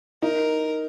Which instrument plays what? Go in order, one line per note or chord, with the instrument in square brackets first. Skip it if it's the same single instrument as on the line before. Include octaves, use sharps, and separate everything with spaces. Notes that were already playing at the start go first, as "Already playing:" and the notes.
[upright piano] D#4 [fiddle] A#4